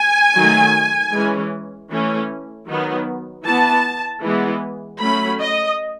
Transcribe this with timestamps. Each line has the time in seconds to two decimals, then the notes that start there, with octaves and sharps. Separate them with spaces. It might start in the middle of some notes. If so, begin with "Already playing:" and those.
Already playing: G#5
0.35 D#3 F#3 A3
1.12 E3 G#3 C#4
1.90 E3 A3 C#4
2.68 D#3 F#3 B3
3.45 E3 B3 A5
4.22 E3 G#3 B3
5.00 F#3 A3 C#4 B5
5.40 D#5